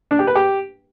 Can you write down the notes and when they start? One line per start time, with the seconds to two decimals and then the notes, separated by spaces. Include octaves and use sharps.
0.11 D4
0.19 G4
0.27 B4
0.35 G4